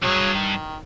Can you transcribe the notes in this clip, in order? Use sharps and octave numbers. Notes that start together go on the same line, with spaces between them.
C2 G2 F#3 G#4 C#5
D#3